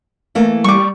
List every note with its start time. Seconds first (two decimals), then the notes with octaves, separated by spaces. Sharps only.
0.35 E3 A3 A#3
0.64 G3 C#6 D6